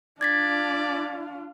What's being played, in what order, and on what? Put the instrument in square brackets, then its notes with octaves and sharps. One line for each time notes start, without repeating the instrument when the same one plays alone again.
[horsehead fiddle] D4 F4 [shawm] D5 [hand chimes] G#6 A6 B6